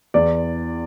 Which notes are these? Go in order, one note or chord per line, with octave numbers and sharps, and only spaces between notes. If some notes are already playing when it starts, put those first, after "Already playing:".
E2 D5